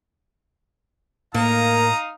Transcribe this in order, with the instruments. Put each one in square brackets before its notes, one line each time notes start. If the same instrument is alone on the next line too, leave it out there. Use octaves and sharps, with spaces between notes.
[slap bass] A2 [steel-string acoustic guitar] A#3 [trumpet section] D#4 F5 D#6 [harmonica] A#5